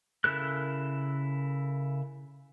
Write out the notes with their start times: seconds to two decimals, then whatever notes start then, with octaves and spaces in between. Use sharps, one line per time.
0.24 C#3 E4 A4 A#4 F#6